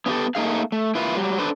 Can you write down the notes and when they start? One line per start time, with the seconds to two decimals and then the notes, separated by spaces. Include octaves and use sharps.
0.06 B3 C#4 F4 G4 A4
0.35 A3 A#3 D#4 G#4 F5
0.72 A3
0.95 A#3 E4 F4 B4
1.16 F#3 G3
1.38 D4 A4 B4 C5